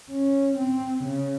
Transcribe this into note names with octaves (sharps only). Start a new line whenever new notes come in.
C#4
C4
C#3